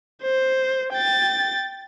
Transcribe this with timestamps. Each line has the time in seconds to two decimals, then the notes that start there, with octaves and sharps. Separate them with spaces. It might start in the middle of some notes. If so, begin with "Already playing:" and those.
0.22 C5
0.93 G5 A6